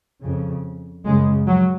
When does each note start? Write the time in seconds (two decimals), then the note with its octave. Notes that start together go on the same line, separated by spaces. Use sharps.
0.22 F2 C#3
1.05 F#2 C#3 G#3
1.47 F#3